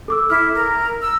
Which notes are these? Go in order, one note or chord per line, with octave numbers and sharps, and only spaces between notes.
A4 D6 E6
E4 F6
A#4
E6